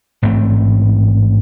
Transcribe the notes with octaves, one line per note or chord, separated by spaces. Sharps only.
A1 G#2 A3 C4